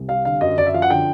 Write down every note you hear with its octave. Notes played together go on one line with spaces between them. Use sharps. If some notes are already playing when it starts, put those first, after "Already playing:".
Already playing: C2
G3 F5
D3 F5
F#2 D#5
F#2 D5
E5
F3 F5
F#5
D3 G5